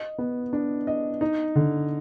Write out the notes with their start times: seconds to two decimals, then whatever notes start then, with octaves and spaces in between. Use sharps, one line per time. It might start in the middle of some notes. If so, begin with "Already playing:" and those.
Already playing: D#5
0.18 B3
0.53 D4
0.87 D#5
1.21 D#4
1.55 D3